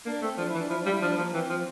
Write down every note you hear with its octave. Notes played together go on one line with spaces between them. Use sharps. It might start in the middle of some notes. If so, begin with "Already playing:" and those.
A#3 D4
A3 C4
F3 D4
E4
E3
D4
F3 E4
D4
G3 F4
E4
F3 D4
F3 A#3
E3 C4
F3